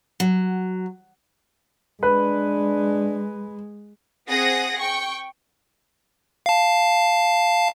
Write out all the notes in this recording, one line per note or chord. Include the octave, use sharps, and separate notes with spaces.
F#3
G#3 D4 B4
C4 G#4 F#5 D#6 A#6
G5 C#6
F5 A5